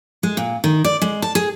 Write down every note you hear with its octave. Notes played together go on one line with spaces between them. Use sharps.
G#3
A#2
D#3
D5
G#3
A5
G#4